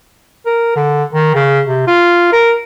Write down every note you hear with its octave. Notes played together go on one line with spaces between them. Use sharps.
A#4
D3
D#3
C#3
C3
F4
A#4